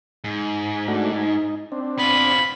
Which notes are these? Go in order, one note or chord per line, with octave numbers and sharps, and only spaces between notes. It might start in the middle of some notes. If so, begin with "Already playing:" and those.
G#2
A3 D4 F#4
D#4
C4 D4
B3 F4 B5